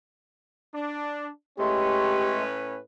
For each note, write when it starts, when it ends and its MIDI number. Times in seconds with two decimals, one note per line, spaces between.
0.75 1.29 62
1.59 2.80 45
1.59 2.44 56
1.59 2.44 57
1.59 2.80 61
1.59 2.36 67
1.59 2.80 71